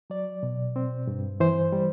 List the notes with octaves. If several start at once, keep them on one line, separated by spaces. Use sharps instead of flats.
F#3 D5
B2
C4
G2
E3 C5
G3